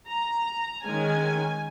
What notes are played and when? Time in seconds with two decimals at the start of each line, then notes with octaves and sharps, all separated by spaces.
0.08 A#5
0.84 D#3 G#3 C#4 G#5